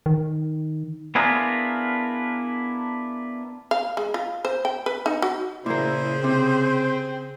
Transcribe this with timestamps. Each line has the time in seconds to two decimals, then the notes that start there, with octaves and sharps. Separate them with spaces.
0.06 D#3
1.15 B3 D4 E4 F4 G#4 A#4
3.71 F5
3.97 G#3
4.14 F4
4.45 C5
4.65 G5
4.86 B4
5.06 D#4
5.22 F#4
5.66 A#2 C#3 A#3 E4 G#4 C5
6.24 C3 C4 G5